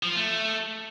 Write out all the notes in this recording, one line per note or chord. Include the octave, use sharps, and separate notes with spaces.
F3
F4
A3